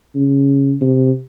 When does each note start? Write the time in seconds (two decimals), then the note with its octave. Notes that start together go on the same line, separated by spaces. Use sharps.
0.15 C#3
0.81 C3